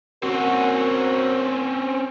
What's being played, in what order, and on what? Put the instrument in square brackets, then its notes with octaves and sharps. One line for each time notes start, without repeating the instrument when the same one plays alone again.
[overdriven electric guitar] C4 C#4 [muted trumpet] F#4 [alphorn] A#4